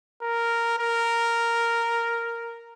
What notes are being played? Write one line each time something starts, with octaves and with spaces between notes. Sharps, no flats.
A#4
A#4